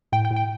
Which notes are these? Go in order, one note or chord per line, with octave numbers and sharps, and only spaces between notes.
A2 G5
G5
A2
G5